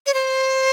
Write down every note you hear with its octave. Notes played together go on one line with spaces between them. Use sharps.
C#5
C5